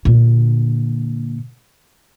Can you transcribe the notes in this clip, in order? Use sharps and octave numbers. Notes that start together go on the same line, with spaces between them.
A#2 D3